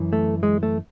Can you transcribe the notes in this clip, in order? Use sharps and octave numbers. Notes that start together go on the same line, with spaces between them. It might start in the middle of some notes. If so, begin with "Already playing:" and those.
Already playing: F#2 E3
A3
G#3
A3